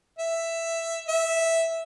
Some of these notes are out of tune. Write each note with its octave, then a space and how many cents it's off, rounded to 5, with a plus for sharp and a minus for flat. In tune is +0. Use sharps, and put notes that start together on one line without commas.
E5 +5
E5 -5